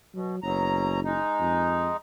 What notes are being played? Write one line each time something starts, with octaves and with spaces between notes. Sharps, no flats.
B2 F#3
F#1 B2 F#3 A#5
G#3 D#4
F2